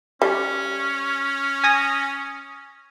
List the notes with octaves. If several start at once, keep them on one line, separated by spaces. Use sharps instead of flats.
G3 C#4
G#5 D#6 A#6